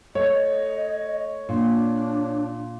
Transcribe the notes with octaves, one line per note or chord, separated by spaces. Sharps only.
A3 C#5 D#5
A#2 D4